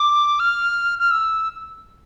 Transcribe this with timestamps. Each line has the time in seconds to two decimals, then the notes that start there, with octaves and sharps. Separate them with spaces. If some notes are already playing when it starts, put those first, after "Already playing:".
Already playing: D6
0.39 F6
0.99 F6
1.11 E6